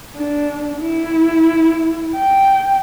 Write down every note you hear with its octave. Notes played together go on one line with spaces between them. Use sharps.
D4
E4
G5